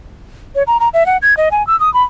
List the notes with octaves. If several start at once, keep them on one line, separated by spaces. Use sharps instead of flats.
C#5
A#5
A#5
E5
F#5
G#6
D#5
G#5
E6
D#6
B5